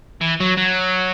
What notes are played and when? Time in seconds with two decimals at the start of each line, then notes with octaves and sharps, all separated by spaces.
0.21 E3
0.40 F#3
0.57 F#3